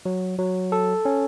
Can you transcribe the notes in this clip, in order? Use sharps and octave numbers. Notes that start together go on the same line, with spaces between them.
F#3
F#3
A4
C#4